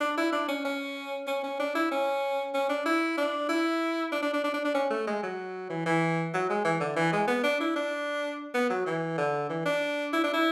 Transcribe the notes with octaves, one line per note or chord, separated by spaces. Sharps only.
D4
E4
D4
C#4
C#4
C#4
C#4
D4
E4
C#4
C#4
D4
E4
D4
E4
D4
D4
D4
D4
D4
D4
C#4
A3
G#3
F#3
E3
E3
F#3
G#3
E3
D3
E3
G#3
B3
D4
E4
D4
B3
F#3
E3
D3
E3
D4
E4
D4
E4